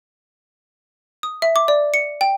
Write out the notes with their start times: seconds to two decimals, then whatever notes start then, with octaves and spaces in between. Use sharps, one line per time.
1.23 D#6
1.42 E5
1.56 D6
1.68 D5
1.94 C#7
2.21 G5